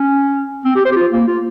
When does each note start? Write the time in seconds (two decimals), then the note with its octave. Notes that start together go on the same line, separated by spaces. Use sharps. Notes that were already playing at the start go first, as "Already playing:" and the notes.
Already playing: C#4
0.65 C4
0.76 G4
0.85 C5
0.92 G4
0.96 F4
1.12 A#3
1.27 F4